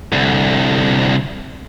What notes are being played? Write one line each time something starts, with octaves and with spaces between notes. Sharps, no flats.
C2 D3